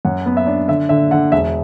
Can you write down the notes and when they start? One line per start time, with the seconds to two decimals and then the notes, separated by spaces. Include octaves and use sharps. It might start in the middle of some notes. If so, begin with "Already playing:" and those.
0.05 F#2 F#5
0.26 B3
0.37 E5
0.47 D4
0.68 D3 E5
0.89 D3 E5
1.11 D3 F#5
1.32 E1 E5